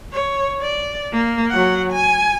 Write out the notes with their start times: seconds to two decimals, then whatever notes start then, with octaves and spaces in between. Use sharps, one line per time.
0.12 C#5
0.61 D5
1.13 A#3
1.51 F#3 F#5
1.93 G#5